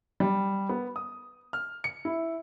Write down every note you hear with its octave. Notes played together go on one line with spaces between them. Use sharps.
G3
B3
D#6
F6
C#7
E4